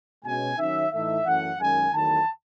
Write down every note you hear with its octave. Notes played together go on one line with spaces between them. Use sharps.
B2 G#3 C#4 G#5
D#3 F#3 C#4 E5
A2 E3 A3 D#4 E5
F#2 E3 A3 C#4 F#5
F#2 D#3 G#3 G#5
E2 D#3 F#3 A3 A5